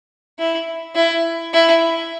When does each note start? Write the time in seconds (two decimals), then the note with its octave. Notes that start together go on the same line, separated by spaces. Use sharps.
0.39 E4
0.95 E4
1.53 E4